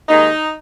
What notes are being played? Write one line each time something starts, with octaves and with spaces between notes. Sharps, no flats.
D#2 D#3 G#3 D#4